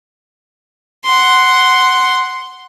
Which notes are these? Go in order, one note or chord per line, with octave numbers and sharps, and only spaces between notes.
F#5 C6